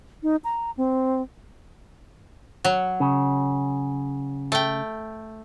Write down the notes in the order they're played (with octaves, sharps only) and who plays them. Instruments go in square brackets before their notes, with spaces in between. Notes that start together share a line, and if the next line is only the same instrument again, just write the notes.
[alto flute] D#4
A#5
C4
[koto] F#3
[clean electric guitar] C#3
[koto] A3 G5